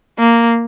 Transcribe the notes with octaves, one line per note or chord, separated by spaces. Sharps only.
A#3